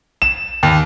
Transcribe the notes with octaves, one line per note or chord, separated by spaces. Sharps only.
E7
D#2